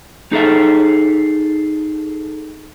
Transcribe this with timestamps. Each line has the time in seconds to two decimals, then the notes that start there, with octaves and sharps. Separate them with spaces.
0.32 D#4 G#4 A4 E5